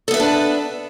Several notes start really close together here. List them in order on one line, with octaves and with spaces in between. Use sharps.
A4 B3 E5 B4 D4